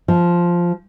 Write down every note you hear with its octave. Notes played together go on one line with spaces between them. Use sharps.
F3